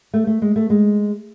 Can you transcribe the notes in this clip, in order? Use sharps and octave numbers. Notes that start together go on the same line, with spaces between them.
A3
A3
G#3
A3
G#3